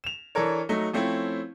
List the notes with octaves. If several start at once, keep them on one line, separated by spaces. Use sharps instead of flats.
E7 F7
E3 D4 A4 A#4 C#5
F#3 A3 D#4
F3 A3 C4 C#4 E4